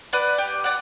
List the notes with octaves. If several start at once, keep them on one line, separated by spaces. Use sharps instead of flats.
B4 D5 F#5
G4
D5 F#5